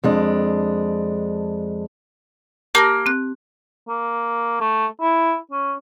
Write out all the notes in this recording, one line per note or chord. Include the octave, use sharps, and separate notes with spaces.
F2 G#3 D4
A#3 G4 A5 A#6
C4 F#6
A#3
A3
E4
C#4